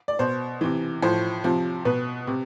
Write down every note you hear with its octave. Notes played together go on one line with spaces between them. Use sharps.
D5
B2 C5
C3 E3
A2 F3 C5
C3 F3
B2 B4
C3